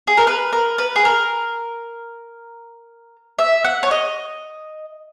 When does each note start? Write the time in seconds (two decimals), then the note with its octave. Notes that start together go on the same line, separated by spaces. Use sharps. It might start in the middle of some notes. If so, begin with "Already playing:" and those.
0.07 G#4
0.17 A#4
0.27 B4
0.53 A#4
0.78 B4
0.96 G#4
1.05 A#4
3.39 E5
3.64 F#5
3.83 C#5
3.91 D#5